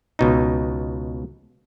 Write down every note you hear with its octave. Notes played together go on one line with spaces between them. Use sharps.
C#2 B2 D#4